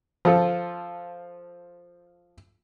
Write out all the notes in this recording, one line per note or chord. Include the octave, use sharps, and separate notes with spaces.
F3 F4 A4